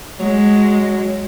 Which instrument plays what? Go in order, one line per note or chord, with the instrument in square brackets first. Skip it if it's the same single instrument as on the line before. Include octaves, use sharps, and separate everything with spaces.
[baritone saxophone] F#3 [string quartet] G#3